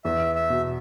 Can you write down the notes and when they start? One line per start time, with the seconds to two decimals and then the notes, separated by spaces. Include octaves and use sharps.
0.04 E2 E5
0.35 E5
0.50 B2